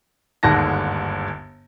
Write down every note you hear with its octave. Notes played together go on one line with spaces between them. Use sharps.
G1 D#2 G#2 D3 A5 A#6